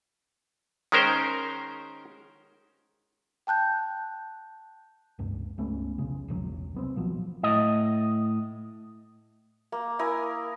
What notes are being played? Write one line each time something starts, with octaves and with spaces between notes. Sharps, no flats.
D#3 G#3 C#4 A#4 C5 G5
G5 A5 F#6 G6
C#2 G2
C#2 A3 B3 C#4
F1 B1 C#3
E1 A#1 F3 F#3
C2 B3 C4
A#2 D#3 F3 F#3
A2 D#5
A#3
E4 A#4 G#5 D#6